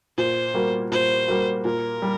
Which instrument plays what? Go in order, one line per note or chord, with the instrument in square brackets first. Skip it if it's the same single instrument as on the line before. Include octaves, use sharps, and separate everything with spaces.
[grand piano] A#2 [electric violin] C5
[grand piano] G3 A#3 F#4
[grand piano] A#2 [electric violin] C5
[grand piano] G3 A#3 F#4
[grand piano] A#2 [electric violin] A#4
[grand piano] G3